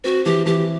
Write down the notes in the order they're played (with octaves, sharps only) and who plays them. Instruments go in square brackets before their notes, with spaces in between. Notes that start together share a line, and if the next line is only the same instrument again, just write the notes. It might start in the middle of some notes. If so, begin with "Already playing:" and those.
[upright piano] C4 [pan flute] F#4
[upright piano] E3 [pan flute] G4
[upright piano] E3 [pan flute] G4